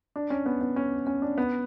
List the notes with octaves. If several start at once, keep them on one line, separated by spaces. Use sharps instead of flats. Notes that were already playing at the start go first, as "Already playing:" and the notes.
D4
C#4
B3
B3
C#4
C#4
D4
B3